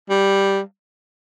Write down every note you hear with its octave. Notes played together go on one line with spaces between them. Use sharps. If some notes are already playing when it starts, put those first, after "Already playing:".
G3